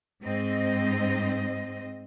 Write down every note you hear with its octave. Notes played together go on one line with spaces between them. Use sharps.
G#2 C4 D#5